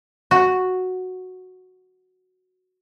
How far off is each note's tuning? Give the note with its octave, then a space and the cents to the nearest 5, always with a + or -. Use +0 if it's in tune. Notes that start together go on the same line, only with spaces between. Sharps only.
F#4 -5